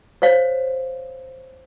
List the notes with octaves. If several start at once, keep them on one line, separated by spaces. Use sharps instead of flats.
C5 C#5 F5